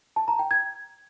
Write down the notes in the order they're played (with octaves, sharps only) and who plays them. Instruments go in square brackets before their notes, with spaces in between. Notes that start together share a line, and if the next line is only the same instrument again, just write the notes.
[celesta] A5
A#5
G5
G#6